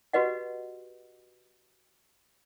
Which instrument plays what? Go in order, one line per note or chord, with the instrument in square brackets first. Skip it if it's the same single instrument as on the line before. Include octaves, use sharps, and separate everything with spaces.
[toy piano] F#4 G4 B4 D#5 F#5